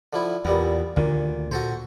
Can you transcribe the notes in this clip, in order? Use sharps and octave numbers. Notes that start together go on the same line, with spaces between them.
D3 F3 E4
E2 A#2 G3 B3
D2 A#2 D3 D#3
A#2 F#4 A4 C5